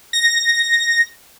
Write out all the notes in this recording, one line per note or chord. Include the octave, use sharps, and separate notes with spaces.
A#6